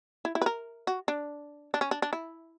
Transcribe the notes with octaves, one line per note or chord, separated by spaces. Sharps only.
E4
E4
B4
A#4
F#4
D4
D4
C#4
D4
D4
E4